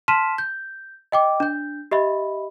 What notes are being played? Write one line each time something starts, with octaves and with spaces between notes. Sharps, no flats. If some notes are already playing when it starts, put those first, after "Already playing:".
A5 C6 F6 B6 D#7 E7
G6
D#5 G5 D6
D4 G6
G4 D#5 E5 B5